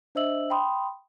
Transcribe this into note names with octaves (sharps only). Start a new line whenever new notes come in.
D4 C5 D#5 E5 E6 F#7
G5 B5 C6 D#6